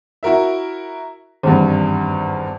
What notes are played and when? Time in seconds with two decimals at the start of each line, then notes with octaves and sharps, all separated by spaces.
0.23 E4 F#4 A#4 E5
1.43 G#1 E2 G2